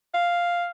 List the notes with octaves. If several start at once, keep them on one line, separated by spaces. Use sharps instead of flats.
F5